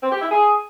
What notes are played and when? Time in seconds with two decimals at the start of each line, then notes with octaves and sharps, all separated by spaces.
0.02 C4
0.11 G4
0.21 E4
0.31 G#4